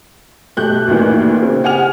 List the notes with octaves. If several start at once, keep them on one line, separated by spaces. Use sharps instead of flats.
B1 A3 G4 F#6 G6
D2 A#2 D#3 E3
C#3 C4
G4 F#5 G#5 F6 F7